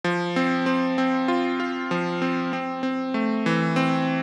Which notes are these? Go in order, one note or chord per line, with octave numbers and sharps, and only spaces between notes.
F3
C4
C4
C4
F4
F4
F3
C4
C4
C4
A3
E3
C4